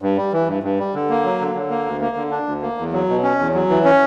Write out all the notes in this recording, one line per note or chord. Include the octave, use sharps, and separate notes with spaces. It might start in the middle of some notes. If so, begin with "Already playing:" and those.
G2
G3
E3
G2
G2
G3
D3
A#3
F#3
D3
D3
A#3
D2
A#3
D3
D4
D2
A#3
E2
F#3
B2
C#4
E2
F#3
E3
C#4